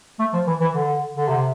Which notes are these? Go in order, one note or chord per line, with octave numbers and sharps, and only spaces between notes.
A3
F3
E3
E3
D3
D3
C3